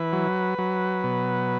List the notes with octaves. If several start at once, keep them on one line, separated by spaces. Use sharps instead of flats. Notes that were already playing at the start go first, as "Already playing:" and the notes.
Already playing: E3 B4
F#3
F#3
B2